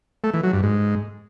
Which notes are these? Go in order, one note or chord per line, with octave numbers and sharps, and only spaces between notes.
A3
E3
F#3
G2
G#2